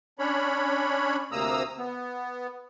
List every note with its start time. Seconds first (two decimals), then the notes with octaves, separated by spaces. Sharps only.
0.19 C#4 D4 C#5 B5
1.32 D2 C3 A#3 A#5 D#6 E6
1.79 B3